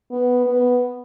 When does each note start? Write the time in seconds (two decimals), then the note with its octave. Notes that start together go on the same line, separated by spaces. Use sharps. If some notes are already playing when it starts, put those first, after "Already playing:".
0.11 B3
0.46 B3